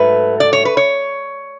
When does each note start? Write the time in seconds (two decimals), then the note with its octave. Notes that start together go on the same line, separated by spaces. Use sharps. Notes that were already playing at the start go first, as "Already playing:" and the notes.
Already playing: G#2 F#3 A3 B4
0.40 D5
0.53 C#5
0.65 B4
0.77 C#5